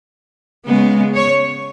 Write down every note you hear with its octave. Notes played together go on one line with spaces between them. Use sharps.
C#3 G#3 B3
C#5